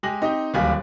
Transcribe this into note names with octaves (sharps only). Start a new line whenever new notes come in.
G#3 G4 G#5 A#6 F#7
C4 D#4 G4 D#5
D1 D#2 G3 F5 G#5 F#6